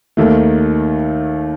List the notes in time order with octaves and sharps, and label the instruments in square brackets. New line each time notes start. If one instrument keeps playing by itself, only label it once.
[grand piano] D#2 D#3 A3